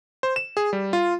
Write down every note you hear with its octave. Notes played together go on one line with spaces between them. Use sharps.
C5
E7
G#4
G3
F4